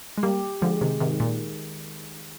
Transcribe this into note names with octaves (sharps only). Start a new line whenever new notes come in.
G#3
G3 A#3 G4
D3 F3 G#3
C3 D#3
G#2 C3 D#3
A#2